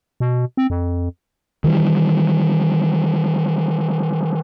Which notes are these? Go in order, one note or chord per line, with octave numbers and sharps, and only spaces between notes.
B2
C4
F2
D#3 E3 G3